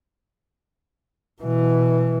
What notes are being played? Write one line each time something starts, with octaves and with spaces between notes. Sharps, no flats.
B2 E3